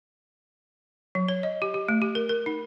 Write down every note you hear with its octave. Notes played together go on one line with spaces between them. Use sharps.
F#3
C#5
D#5
G4
G4
A3
G4
A#4
A#4
D#4